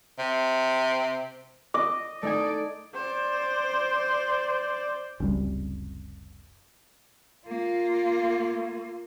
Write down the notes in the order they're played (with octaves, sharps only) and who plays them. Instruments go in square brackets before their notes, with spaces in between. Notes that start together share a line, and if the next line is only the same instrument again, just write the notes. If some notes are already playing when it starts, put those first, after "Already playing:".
[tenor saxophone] C3
[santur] D#5 [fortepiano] D6
[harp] A3 D#4 G#5 [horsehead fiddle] D5
[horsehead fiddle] C5 D5
[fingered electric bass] F#1 C#2 C3 G3
[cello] A#3 F4